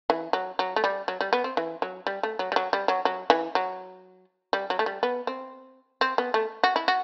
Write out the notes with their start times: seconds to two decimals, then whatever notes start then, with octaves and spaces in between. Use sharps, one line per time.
0.10 E3
0.33 F#3
0.59 F#3
0.76 A3
0.84 G3
1.08 F#3
1.21 G3
1.33 B3
1.44 C4
1.57 E3
1.82 F#3
2.07 G3
2.23 A3
2.39 F#3
2.52 G3
2.56 F#3
2.73 G3
2.88 F#3
3.05 F#3
3.30 E3
3.55 F#3
4.53 G3
4.70 F#3
4.79 A3
4.86 G3
5.03 B3
5.27 C4
6.01 C4
6.18 B3
6.34 A3
6.64 F#4
6.76 E4
6.88 F#4